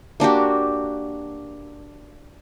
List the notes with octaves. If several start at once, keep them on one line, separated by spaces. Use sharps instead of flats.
A#3 D4 F#4 G4